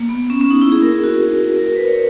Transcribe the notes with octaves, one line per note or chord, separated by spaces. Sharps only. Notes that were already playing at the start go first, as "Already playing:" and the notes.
Already playing: A#3
B3
C#4
C#4
D#4
E4
G#4
A#4
G#4
F#4
A#4
A#4
B4
C#5